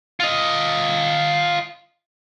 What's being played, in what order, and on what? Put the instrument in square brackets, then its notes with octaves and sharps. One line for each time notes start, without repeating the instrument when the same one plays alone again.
[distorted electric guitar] F4 D#5